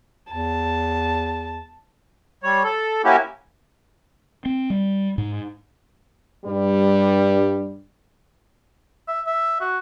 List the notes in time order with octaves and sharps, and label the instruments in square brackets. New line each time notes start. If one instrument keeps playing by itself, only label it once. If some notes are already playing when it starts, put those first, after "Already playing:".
[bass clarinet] E2 [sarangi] A5
[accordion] G3 C#5
A4
A#3 C#4 E4 F#4 G4
[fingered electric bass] C4
G3
G#2
[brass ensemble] G2 G3
[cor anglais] E5
E5
F#4